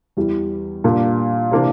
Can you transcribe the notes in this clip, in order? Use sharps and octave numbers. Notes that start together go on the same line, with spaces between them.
E2 E3 G3
A#2 G3 A#3 D4 F4
C3 E3 A#3 D4